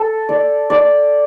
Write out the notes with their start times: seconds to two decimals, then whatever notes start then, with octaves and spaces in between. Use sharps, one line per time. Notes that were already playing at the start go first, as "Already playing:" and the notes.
Already playing: A4
0.29 D5
0.70 D5